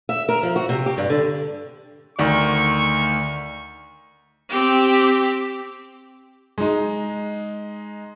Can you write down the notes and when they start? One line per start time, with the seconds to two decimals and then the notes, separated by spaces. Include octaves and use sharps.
0.09 E5
0.29 A#4
0.43 F3
0.56 F#4
0.69 C3
0.86 G4
0.98 G2
1.10 D3
2.19 D2 D#3 D4 C#6
4.50 C4 G4
6.58 G#3 D#4